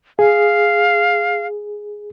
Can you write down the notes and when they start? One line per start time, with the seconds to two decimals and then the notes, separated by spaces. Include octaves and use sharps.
0.19 G#4 F5